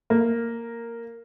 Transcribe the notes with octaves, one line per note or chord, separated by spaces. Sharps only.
A#3